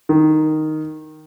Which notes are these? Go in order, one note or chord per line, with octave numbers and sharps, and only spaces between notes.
D#3